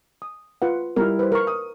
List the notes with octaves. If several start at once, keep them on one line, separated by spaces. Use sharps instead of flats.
D#6
F4 B4 F#5
G3 E4 A#4
B4 C5
A#4 C#6
D#6